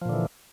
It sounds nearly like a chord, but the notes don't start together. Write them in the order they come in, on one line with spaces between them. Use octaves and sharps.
F3 A#2 D3 E3